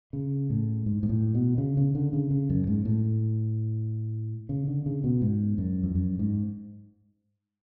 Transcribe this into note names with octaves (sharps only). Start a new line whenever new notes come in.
C#3
A2
G#2
G#2
A2
B2
C#3
C#3
D3
C#3
C#3
F#2
G#2
A2
C#3
D3
C#3
B2
G#2
F#2
F2
F#2
G#2